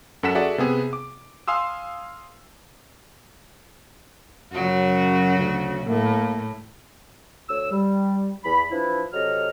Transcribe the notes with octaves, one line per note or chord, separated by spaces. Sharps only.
F#2 A4 F#5 B6 E7
F#4 G#4 A4 D5 E5 F#5
C3 B3 G#4
D6
F5 G#5 C6 D#6 E6
F#2 C#3 F#3 F#4
D2
A2 A#3
D2 C#5 E6
G3
E2 B5
E3 F3 D4 E4
C3 F#3 A4 D#5 F6